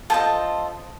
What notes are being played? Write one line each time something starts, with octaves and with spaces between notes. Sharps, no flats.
F4 A4 C5 D#5 A5